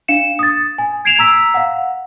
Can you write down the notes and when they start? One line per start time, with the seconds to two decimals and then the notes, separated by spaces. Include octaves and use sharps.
0.08 D4 F5 C#7 E7
0.39 D#6 A6
0.78 G#5
1.05 G#6 C7 D7 E7 F7
1.19 A#5 E6 B6
1.54 F5 F#5